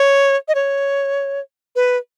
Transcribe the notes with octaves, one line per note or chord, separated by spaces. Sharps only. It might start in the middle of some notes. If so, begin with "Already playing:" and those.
Already playing: C#5
D#5
C#5
B4